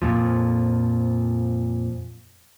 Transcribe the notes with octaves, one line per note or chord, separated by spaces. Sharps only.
F2 A#2 F3